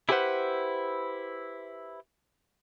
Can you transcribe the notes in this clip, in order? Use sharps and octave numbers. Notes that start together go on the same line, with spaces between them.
E4 G4 G#4 B4 C5 F#5